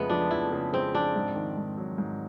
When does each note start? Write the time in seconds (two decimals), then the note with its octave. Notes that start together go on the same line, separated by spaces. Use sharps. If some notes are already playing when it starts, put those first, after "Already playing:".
Already playing: F2 C#3 G#3 A3 B3
0.10 F3 D4
0.31 F2 E4
0.52 C#3
0.73 G#3 C4
0.94 F3 D4
1.16 G#2
1.36 D#3
1.57 G#2
1.78 F#3
1.98 G#2